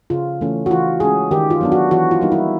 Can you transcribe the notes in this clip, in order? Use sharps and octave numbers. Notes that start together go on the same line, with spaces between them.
C#3 F4
E3 A3 C#4
F#4
E3 F4
G#3 C#4 G#4
D#3 G4
F4
F#3 B3 D4
F#4
E3 F#4
F4
G3 A#3 D#4
E4